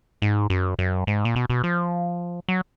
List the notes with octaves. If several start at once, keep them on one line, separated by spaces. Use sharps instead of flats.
G#2
F#2
F#2
G#2
A#2
B2
B2
F3
F#3